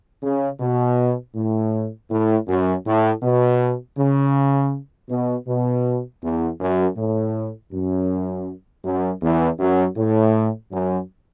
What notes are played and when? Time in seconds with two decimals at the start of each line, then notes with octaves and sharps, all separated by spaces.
0.23 C#3
0.60 B2
1.35 A2
2.10 A2
2.47 F#2
2.85 A2
3.22 B2
3.97 C#3
5.09 B2
5.47 B2
6.22 E2
6.60 F#2
6.97 A2
7.72 F#2
8.84 F#2
9.22 E2
9.59 F#2
9.97 A2
10.71 F#2